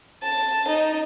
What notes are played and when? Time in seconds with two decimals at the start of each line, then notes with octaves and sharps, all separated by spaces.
0.23 A5
0.68 D#4